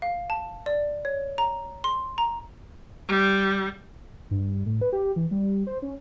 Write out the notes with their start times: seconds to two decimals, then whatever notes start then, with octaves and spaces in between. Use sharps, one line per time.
0.02 F5
0.30 A5
0.66 D5
1.05 C#5
1.38 A#5
1.84 C6
2.18 A#5
3.09 G3
4.31 G2
4.66 A2
4.81 B4
4.92 G4
5.16 E3
5.31 G3
5.67 C5
5.82 C#4